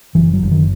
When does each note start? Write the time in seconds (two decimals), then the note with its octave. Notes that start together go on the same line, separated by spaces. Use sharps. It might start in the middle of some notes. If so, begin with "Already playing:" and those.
0.15 F#1 E3
0.33 F#3
0.43 F#1
0.51 D#3